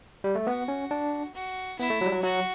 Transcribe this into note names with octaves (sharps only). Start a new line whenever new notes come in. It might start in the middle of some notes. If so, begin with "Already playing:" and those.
G3
A3
B3 F#4
C#4
D4
F#4
B3 E4
A3
F#3
G3
F#3
F#3 F#4